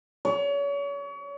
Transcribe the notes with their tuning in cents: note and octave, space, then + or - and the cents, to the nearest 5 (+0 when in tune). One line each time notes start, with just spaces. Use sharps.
C#5 +35